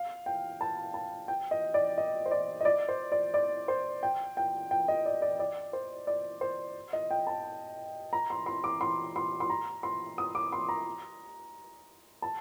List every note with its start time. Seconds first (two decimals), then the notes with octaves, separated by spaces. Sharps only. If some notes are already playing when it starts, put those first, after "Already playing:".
Already playing: F5
0.26 G5
0.61 A5
0.94 A5
1.28 G5
1.51 D#5
1.74 D5
1.98 D#5
2.26 C5
2.31 D5
2.61 D#5
2.65 D5
2.89 C5
3.12 D5
3.34 D5
3.68 C5
4.03 G5
4.37 G5
4.71 G5
4.88 D#5
5.05 D5
5.22 D5
5.39 D5
5.73 C5
6.07 D5
6.41 C5
6.93 D#5
7.11 G5
7.27 A5
8.13 A#5
8.30 C6
8.46 C6
8.64 D6
8.81 C6
9.16 C6
9.40 C6
9.50 A#5
9.83 C6
10.18 D#6
10.35 D6
10.52 C6
10.69 A#5
12.22 A5